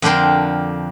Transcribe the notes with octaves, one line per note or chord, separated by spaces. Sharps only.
F2 D3 D4 A#4 G5 C6